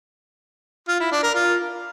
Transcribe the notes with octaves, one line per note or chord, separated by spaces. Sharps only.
F4
E4
D4
A#4
F4